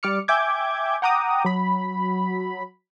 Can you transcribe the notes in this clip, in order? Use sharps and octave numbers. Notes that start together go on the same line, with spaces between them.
G3 D5 D6 F6 C#7
E5 G5 G#5 D6 G6 G#6
F#5 G5 A#5 D6 D#6
F#3 B5